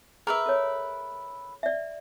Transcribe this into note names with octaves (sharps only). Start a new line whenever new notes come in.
G#4 A#4 B4 E5
A4 C#5
D5 E5